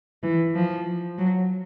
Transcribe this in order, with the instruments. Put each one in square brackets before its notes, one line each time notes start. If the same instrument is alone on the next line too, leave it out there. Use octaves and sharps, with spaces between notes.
[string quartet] E3
F3
F#3